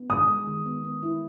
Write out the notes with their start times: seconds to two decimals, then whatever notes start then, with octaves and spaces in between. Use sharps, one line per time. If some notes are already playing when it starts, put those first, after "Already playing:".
Already playing: B3
0.10 G#3 D#6
0.28 G#3
0.47 D#3
0.66 B3
0.84 B3
1.03 E4